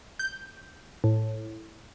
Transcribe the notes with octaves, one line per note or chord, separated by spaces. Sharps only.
G6
A2